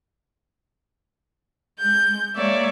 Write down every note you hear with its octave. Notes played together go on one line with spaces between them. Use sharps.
G#3 G6
G#3 A#3 C#5 D5 E5